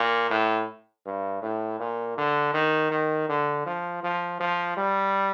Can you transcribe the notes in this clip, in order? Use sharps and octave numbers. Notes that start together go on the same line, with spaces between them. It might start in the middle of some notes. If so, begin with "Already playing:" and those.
Already playing: A#2
A2
G2
A2
A#2
D3
D#3
D#3
D3
F3
F3
F3
G3